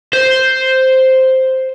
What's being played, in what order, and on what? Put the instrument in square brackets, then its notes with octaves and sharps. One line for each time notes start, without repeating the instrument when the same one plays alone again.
[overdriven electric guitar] C5